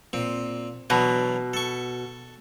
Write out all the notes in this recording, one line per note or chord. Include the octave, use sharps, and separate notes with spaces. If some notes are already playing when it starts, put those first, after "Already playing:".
A#2 C4
B2 E3 F#3 D4
A4 C#6